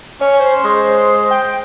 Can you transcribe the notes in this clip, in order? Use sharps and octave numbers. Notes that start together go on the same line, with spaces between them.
C#4 C#5
C5
G#3
G5